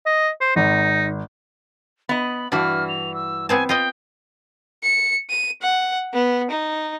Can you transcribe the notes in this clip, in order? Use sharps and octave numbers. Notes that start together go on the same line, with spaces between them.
D#5
C5
G#1 D#4
B3 D#5 B5
G2 E3 D4 F#4 F6
F7
E6
B3 C4 G#5 A5
F4 D#5 F5 G5
C#7
D#7
F#5
B3
D#4